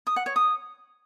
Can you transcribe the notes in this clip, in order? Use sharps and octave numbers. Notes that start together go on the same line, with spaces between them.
D#6
F#5
C#5
D#6